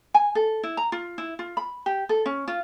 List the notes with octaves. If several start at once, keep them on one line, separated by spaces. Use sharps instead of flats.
G#5
A4
E4
A#5
F4
E4
F4
B5
G4
A4
C#4
F4